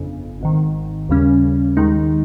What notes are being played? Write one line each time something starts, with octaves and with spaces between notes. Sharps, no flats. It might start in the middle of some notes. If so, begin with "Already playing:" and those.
Already playing: G1 F2 C#3
G#1 G#2 D#3
D#2 C#3 G3 C#4
D#2 D#3 G#3 D#4